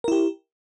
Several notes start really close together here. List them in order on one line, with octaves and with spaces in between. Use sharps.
A#4 E4 G4